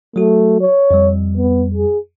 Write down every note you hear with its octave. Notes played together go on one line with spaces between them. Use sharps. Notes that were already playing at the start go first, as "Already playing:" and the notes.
F#3 A3 F#4
C#5
F2 G3
B3
G#4